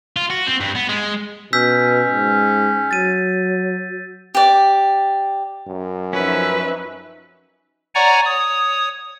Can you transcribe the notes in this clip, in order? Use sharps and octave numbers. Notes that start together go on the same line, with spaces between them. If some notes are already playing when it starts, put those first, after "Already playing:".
F4
F#4
C4
G2
B3
G#3
B2 C#4 E6 G6 B6
G#2
F#3 A6 D#7
G4 D5
F#2
F3 C#4 D#4 B4 E5
C#5 D5 F#5 G#5 A#5 C#6
C#5 D#6